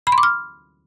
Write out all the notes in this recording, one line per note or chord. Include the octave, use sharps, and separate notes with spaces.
B5
C6
D6
F6